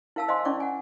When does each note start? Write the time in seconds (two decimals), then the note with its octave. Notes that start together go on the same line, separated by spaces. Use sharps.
0.16 E4 A#4 F5 A5 E6
0.28 C5 D#5 F5 G#5 C6
0.45 C#4 E4 D5 C#6 D6
0.60 F#5 G#5